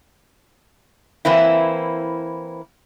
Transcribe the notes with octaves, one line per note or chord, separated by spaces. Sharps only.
E3 A#3 C4 E4